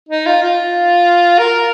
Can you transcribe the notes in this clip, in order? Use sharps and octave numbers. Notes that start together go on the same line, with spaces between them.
D#4
F4
F4
A#4